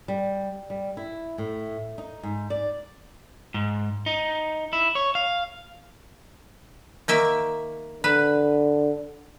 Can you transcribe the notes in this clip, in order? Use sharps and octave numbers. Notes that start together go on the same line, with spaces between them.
G3
G3
E4
A2
D#4
G#2
D5
G#2
D#4
E4
C#5
F5
D#3 A#3 E5
D3 B4